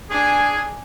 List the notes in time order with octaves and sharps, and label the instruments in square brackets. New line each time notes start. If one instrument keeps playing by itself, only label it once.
[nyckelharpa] D4 G#5 [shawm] G#4